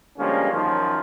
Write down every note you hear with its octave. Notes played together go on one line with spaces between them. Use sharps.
D3 F3 G3 G#3 A#3 C#4
F#2 D#3 F3